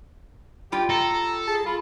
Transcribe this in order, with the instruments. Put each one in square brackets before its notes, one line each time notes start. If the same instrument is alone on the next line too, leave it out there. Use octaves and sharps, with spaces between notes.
[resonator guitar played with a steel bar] G3 F4 G5 [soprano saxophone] G4
[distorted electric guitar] A4 [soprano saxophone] A#5
[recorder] G#4 [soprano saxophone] A5
[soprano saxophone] F4 [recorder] B5